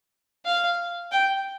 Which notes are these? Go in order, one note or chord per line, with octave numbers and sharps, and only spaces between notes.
F5
G5